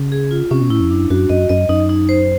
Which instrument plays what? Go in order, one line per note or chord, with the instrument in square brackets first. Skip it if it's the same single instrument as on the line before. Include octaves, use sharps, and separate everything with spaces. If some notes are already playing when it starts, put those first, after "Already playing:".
Already playing: [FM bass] C#3
[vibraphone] G#4
F4
[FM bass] C3 [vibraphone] C#4
[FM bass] B2
[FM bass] A2 [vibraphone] E4
[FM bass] F2
[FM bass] F#2 [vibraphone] D4
[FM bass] F#2 [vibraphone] F#4
[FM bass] F#2 [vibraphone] D#5
[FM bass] F#2 [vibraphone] D#5
[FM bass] F#2 [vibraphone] D#4
[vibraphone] D#4
C5